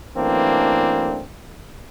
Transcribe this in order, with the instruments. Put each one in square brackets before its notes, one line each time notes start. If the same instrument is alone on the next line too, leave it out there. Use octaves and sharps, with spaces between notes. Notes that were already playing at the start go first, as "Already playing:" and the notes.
[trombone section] F#2 E3 A3 A#3 C4 D4